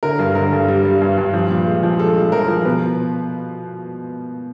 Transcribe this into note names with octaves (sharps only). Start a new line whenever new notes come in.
D3 A#4
G2
D3 A#4
G2
G3
G3
G2
G2
F3
A#2
G#3
F3
G#3 A4
G#3
F3 A#4
F3
B2 B4